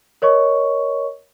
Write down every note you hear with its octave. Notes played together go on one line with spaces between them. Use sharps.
A#4 C#5 D#5 C#6